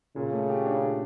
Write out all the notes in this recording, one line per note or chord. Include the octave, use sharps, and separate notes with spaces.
A#2 C#3
A3
G4
D4
A#2